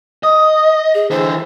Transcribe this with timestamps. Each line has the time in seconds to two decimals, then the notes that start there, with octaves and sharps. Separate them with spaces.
0.23 D#5 D#6
0.94 G#4
1.11 D3 E3 C5